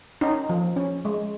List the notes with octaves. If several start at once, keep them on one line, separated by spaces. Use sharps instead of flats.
C#4 D#4
F3
C#4
G#3